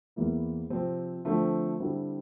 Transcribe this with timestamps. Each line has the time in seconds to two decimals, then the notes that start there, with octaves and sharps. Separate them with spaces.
0.16 E2 E3 A#3 E4
0.70 C3 F3 C4
1.25 D3 F3 A3 C4
1.80 D3 G3 C4 E4